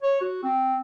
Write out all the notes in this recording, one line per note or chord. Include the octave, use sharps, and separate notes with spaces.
C#5
F#4
C4